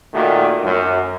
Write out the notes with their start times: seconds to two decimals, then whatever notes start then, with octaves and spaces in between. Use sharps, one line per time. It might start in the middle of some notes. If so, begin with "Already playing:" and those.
0.14 A#2 D#3 A3 F#4
0.65 F#2